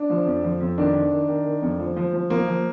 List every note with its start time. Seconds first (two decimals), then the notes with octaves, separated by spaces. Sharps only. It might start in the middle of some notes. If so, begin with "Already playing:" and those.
Already playing: D4
0.10 F3
0.26 F2
0.44 F3
0.61 F2
0.78 D#3 D4
0.94 D#3
1.12 D#3
1.28 D#3
1.45 D#3
1.62 F2
1.80 F3
1.96 F3
2.13 F3
2.30 F3 A#3
2.47 F3